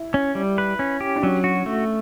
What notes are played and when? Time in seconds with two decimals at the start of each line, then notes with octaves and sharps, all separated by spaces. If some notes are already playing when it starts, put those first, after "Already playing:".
Already playing: E4
0.14 C#4
0.35 G3
0.58 B4
0.79 C#4
1.01 G4
1.16 D4
1.22 F#3 C#4
1.44 F#4
1.66 A3